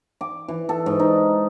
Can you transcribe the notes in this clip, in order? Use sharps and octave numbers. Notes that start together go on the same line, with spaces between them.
D6
E3
A4
G#2
D#4